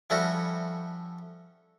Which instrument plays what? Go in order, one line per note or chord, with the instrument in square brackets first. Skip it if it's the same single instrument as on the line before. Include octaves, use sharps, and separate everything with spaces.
[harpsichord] F3 G3 A3 C#4 E4 F#4